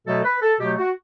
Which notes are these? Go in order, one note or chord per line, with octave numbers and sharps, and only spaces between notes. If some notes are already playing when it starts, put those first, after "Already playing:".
B2 F#3 A3 A4
B4
A4
B2 F#3 A3 G4
F#4